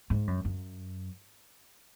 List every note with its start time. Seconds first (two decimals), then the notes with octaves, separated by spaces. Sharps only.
0.10 G#2
0.27 F#2
0.45 F#2